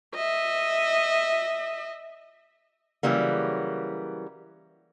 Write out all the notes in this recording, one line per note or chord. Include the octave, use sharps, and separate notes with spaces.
D#5 E5
C#3 E3 F#3 G3 A#3